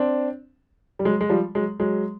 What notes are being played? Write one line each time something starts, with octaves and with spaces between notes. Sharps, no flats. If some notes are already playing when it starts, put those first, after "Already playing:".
Already playing: C4 D4
G3
F#3 G#3
G#3
F3 G3
F#3 G#3
F#3 G#3